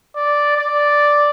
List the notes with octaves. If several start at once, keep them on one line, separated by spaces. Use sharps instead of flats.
D5
D5